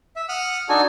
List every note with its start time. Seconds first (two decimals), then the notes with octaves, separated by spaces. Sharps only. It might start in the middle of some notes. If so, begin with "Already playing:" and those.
0.16 E5
0.29 F#5 D#6 F6 F#6
0.69 D4 D#4 F#4 A4 G#5